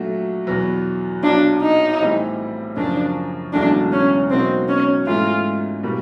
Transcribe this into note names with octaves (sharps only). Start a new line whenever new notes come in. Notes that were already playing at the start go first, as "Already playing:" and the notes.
Already playing: A#2 F#3 A3 D4 F#4
E2 B2 F#3 B3
B1 A#2 F#3 D4
D#4
A2 E3 G3 C4
F#2 C#3 F3 A#3 D4
E1 E2 C#3 F#3 A3 D4
C#4
B2 F#3 A#3 C4 D#4 F#4
C#4
G#2 E3 A3 C#4 F4
B2 G3 A#3